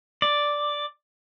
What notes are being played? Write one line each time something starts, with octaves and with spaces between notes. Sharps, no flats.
D5